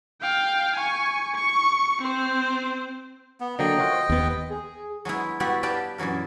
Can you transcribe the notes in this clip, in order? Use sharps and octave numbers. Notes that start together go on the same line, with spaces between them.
F5 G5
G#5 C#6
C#6
C4 C5
B3
D3 F#3 A#3 D#5 G5
F4 F#4
C5
D#2 B3
G#4
F#3 G#3 B3 E4
G3 B3 E4 F#4 G4
G4 B4 D5 F5 G5 A5
F#2 A#2 E3 F#3 A#4